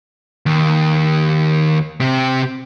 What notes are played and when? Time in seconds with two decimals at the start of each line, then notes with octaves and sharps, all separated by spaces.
0.46 D#2
2.00 C3 G4